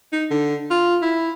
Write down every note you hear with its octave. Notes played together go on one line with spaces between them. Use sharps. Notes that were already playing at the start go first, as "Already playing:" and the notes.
D#4
D3
F4
E4